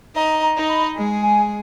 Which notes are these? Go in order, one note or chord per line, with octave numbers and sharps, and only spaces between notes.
D#4 D#5 A#5
A#5
D#4 D#5
B5
G#3 G#4
G#5